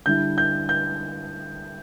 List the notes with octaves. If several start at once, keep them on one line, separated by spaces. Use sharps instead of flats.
D3 G3 E4 G6
G6
G6